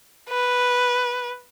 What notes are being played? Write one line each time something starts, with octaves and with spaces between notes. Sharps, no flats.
B4